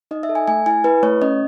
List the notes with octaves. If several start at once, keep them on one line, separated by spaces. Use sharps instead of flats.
D#4 D#5
E5
A4
G#5
A3 G#5
E4 G#5
E4 B4
A3 C#5
C#4 D#5